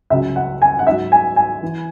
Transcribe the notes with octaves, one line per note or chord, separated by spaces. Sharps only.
C#2 C#3 F#3 E5
F#5
G#5
F#5
G#2 F#3 E5
G#5
G#5
E3